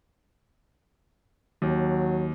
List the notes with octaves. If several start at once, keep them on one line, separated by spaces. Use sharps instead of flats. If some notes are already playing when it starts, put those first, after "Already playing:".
D#2 F#3